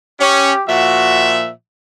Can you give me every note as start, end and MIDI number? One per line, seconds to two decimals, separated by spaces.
0.20 0.52 61
0.20 0.62 67
0.68 1.50 46
0.68 1.50 53
0.68 1.39 66
0.68 1.50 76